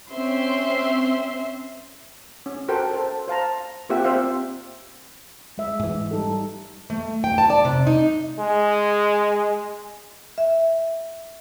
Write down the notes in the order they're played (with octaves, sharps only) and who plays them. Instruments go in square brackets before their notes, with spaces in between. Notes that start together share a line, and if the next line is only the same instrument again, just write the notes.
[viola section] C4 C#4 E5 C6
[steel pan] C#4
F#4 A4 A#4 C5 F#5 G5
A4 C5
C5 F5 A5 A#5
A#3 C4 F4 G4 E5 F#5
C4 G4 C5 E5 F5
[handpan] G#3 E5
[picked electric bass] G#2 E3
[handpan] G3 D#4 A4
[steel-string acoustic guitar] A3
G5
A5
D5
C3
D#4
[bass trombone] G#3
[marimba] E5